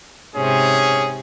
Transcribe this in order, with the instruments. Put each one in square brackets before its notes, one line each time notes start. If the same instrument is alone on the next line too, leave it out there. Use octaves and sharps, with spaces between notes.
[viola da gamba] G#2 C3 [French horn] C#4 [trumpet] G#4